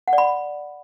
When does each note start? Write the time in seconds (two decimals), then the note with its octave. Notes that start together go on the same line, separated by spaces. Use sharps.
0.08 F#5
0.13 D5
0.18 B5